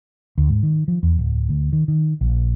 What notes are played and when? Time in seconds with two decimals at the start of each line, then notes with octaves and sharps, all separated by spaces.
0.38 D2
0.49 G#2
0.63 D#3
0.88 F3
1.03 E2
1.19 D1
1.49 D2
1.73 D#3
1.88 D#3
2.21 A#1